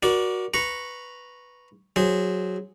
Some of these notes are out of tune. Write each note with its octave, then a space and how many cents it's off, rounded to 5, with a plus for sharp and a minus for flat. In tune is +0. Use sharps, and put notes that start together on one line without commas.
F#4 +0 A#4 +30 D5 -5
B4 +0 A#5 +0 C#6 -5
F#3 +0 G#4 -10 C5 +0